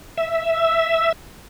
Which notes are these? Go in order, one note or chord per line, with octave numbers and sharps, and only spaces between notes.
E5